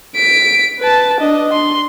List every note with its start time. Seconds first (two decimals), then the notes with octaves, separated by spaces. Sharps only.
0.15 B6 D7
0.80 B4 A5
1.21 D4 D#5
1.53 C6